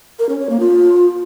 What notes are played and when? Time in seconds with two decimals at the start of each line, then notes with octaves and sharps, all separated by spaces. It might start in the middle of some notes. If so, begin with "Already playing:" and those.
0.19 A#4
0.29 C#4
0.39 C#5
0.50 A#3
0.60 F4